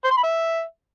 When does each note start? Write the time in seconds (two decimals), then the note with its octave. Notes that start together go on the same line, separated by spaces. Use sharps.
0.05 C5
0.11 C6
0.17 B5
0.24 E5